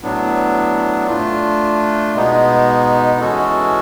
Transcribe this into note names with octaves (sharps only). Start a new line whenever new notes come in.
A2 F#3 B3 D4
A3 D4 F4
B2 G#3 B3 D#4
E3 G#3 C#4 F#4 A4